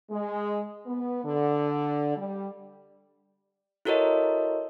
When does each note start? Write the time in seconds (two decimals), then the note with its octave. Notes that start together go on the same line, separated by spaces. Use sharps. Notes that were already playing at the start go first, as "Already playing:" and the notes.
0.10 G#3
0.86 B3
1.24 D3
2.16 G3
3.85 E4 F#4 A4 A#4 C#5 D#5